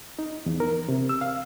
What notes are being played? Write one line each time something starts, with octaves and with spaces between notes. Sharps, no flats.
D#4
E2
A#4
C3
E6
F5